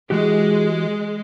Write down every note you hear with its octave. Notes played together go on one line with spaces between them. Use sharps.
E3 G#3 F#4 G4